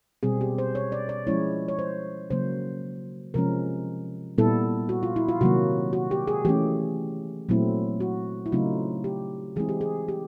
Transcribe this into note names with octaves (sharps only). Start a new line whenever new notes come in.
B2 G3 C4 G#4
G4
C5
C#5
D5
D5
F3 G#3 C#4 E4 C#5
C#5
C5
C#3 F#3 A#3 C5
C3 F3 G#3 C#4 A#4
A#2 G3 B3 E4 A4
F#4
F4
E4
F4
C3 D#3 F#3 A#3 F#4
F#4
G4
G#4
E3 A3 C#4 G4
A#2 F#3 A3 C4 E4
F#4
E4
C#3 F#3 A3 C4 D#4 F4
G4
E3 G#3 C4 E4 G#4
G4
G#4
G4